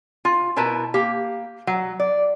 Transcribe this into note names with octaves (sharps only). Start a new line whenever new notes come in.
F4
B2 E4 A#4 B4 A5
A#3 G4
F#3
D5